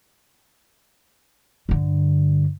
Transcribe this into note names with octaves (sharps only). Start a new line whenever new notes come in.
G2 D3